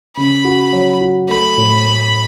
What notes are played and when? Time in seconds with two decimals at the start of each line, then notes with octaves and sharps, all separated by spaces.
0.17 C#3 B5
0.45 F#4
0.73 F#3
1.01 F#4
1.29 A3 B5
1.58 A2
1.86 A3